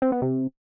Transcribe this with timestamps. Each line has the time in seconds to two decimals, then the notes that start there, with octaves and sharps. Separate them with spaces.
0.02 C4
0.12 B3
0.22 C3